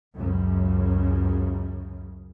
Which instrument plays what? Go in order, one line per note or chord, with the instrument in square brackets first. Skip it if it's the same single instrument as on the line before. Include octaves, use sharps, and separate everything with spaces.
[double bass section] C#2 F#2 C#3